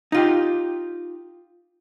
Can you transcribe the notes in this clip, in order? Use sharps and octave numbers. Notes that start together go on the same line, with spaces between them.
D#4 F4 G4